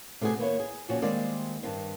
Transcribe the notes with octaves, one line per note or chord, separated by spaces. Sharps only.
C3 A3 B3 F#4 G#4
D#3 A#3 B3 E4 C#5
G#4
A#2 C#3 F3 C#4 F#4
D#3 G3 G#3 A#3 C4 D5
G2 D#3 C4